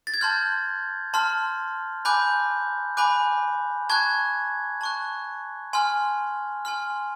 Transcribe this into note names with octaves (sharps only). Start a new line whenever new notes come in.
A6
G#6
A5 C6 F6 G6
A5 C6 F6
G#5 B5 D6 F#6 G6
G#5 B5 D6 F#6
A5 C#6 F#6 G#6
A5 C#6 F#6
G#5 C6 F6
G#5 C6 F6